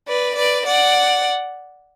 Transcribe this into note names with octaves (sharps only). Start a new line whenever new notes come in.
B4 D5
B4 D5
D5 F#5